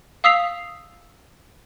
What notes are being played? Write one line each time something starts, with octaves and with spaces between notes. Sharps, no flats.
F5 D#6 E6 B6 C7 F7